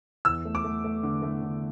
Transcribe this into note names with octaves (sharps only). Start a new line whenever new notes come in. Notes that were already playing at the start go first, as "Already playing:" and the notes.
E2 E6
A3
D6
A3
A3
D3
A3
D3